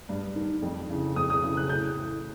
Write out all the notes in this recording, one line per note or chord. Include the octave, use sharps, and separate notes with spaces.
G2
D#3
F2
C#3 E3
F2 D#6
D#6
C#3 E3
F#6
A2 G6
E3